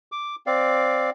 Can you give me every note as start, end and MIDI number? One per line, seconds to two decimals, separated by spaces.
0.12 0.35 86
0.47 1.10 60
0.47 1.10 74
0.47 1.10 77